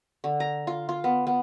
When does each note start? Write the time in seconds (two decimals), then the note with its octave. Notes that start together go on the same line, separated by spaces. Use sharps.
0.24 D3
0.40 A#5
0.67 F4
0.89 F4
1.04 B3
1.27 B3